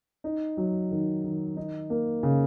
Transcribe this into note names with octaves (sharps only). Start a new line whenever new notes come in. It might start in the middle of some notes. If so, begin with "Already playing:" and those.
D#4
F#3
D#3
D#3
D#4
A#3
C#3